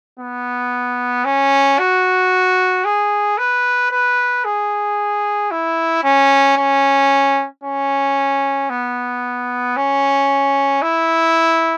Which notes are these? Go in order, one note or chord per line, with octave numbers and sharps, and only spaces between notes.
B3
C#4
F#4
G#4
B4
B4
G#4
E4
C#4
C#4
C#4
B3
C#4
E4